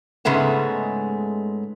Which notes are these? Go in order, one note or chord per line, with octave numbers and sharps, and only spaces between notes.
G#2 C#3 G#3 A3 B3